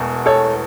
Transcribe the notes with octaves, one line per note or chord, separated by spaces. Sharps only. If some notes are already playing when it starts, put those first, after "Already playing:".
Already playing: E1 E2 B2 A3
A4 C#5